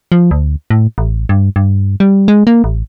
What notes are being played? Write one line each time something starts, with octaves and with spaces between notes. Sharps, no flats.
F3
D2
A2
A1
G2
G2
G3
G#3
A#3
A1